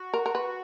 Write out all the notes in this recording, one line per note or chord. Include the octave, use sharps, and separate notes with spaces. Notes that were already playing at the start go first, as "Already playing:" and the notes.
Already playing: F#4
A#4
A#4
B4